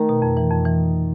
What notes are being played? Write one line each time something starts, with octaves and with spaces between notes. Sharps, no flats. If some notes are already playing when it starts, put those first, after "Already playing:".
Already playing: D#3 A3
B2
F2
E3
F2
E3